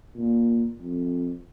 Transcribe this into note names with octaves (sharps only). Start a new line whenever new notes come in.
A#2
F2